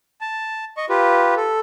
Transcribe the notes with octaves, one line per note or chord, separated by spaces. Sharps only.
A5
D#5 C#6
F4 G4 B4
A4